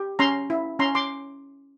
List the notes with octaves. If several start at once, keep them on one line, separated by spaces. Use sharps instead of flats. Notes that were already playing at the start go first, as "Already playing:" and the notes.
Already playing: G4
C#4 A#5 C6
E4
C#4 A#5 C6
C6 D6